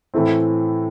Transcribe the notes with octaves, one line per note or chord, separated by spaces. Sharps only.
A2 E3 A3 C4 E4